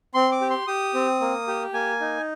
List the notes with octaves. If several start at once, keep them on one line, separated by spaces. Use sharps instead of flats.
C4 C6
D6
G4
C6
G4 D#6
C4
A#3
G4
A#3 G#5
D#4